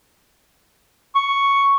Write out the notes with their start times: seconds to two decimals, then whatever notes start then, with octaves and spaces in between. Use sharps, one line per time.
1.15 C#6